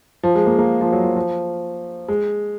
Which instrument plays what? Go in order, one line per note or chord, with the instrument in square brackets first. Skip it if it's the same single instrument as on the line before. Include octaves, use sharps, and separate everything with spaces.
[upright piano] F3
G#3
A#3
A#3
F3
F#3
F3
F3
G#3